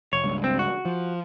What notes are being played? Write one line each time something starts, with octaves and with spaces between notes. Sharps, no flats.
F1 C#5
C#2 G2
C4
F#4
F3